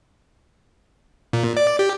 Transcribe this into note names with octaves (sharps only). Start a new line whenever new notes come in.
A#2
D5
G4